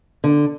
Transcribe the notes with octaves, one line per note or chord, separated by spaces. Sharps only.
D3